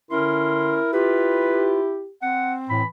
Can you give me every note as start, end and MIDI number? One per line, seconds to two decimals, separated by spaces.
0.11 0.76 50
0.11 0.80 61
0.11 2.06 64
0.11 0.91 70
0.11 0.76 84
0.93 1.81 65
0.93 2.12 67
0.93 1.81 71
2.22 2.82 60
2.22 2.54 78
2.69 2.83 45
2.69 2.86 52
2.69 2.86 83